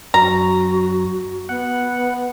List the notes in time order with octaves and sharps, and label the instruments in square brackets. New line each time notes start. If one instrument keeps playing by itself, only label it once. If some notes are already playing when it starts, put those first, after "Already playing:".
[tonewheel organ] F#2 [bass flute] F#4 [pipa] A#5
[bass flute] B3 [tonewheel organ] F#5